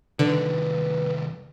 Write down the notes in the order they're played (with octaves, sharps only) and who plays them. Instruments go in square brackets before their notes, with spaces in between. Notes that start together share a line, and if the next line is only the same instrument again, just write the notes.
[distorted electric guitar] C2 D#3 [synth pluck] D3 [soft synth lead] B4